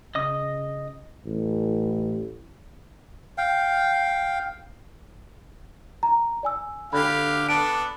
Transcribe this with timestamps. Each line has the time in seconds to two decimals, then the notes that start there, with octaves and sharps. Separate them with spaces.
0.15 C#3 D#5 D#6
1.25 A1
3.38 F5 G5
6.03 A#5
6.43 D5 G#5 E6
6.93 D3 G4 F5 B5
7.49 B3 D4 A4 D7